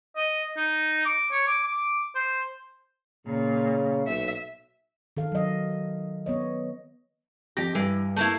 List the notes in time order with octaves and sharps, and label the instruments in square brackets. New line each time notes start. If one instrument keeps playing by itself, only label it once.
[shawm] D#5
D#4
D6
C#5
D6
D6
C5
[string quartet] A#2 [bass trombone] C#3
[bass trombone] B1 [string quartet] E5
[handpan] D#3 A4 F5
F#3 D#5
B3 C#5 D#5
[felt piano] F2 A#6 [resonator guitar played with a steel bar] G4
[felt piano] G2 G3 [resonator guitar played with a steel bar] E3
[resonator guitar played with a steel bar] A3 A#3 E4